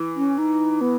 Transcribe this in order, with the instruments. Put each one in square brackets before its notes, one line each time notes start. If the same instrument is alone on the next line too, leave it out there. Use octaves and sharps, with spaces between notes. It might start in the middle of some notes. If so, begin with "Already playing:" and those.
Already playing: [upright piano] E3
[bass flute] C#4
D#4
B3